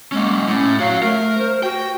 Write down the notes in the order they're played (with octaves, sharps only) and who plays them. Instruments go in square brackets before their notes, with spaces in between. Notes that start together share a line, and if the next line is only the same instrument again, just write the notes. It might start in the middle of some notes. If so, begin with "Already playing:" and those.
[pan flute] G#3 [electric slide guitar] A#3 C#4
[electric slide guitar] A2 [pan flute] C#4
[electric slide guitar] F#4 C#5 [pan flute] F5
[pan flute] A3 [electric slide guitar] A#4
[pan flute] C5
[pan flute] F#4 [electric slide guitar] G5